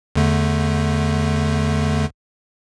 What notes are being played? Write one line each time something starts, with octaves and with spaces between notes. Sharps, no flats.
E2 D3 A3